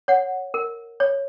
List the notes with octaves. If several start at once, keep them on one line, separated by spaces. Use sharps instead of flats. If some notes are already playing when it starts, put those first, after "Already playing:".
C#5 F#5
A#4
C#5